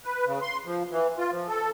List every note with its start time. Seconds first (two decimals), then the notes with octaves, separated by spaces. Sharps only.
0.05 B4
0.26 C#3
0.42 C6
0.65 F3
0.91 E3
1.18 F4
1.31 F3
1.48 A4